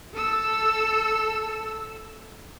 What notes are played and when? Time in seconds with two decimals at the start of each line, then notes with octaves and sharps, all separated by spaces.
0.14 A4 E6